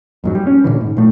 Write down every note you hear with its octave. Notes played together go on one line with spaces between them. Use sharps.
F2 G#2 F#3
G3
C#4
A#2 D3 E3
G#2
A#2 A3